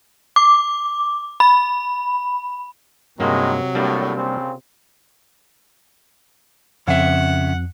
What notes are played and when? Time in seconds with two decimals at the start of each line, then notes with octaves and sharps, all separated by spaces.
0.36 D6
1.40 B5
3.20 E2 G2 C3 D#3 F#3 G#3 A#3
3.75 A2 G3 A#3 D4
4.16 A#2 C#3 C4
6.87 F2 C#3 E5 F#5